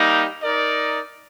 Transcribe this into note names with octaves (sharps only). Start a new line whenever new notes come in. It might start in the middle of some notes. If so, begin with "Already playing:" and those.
Already playing: G3 A#3 D#4 G4
D#4 A#4 D5